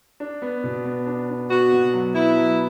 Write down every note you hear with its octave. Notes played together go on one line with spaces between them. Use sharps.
D4
B3
B2
B3
D4
D4
B3 F#4
B2
F#3
B3 E4
F#3